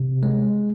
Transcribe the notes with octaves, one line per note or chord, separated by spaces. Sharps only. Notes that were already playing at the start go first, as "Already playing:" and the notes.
Already playing: C3
G#3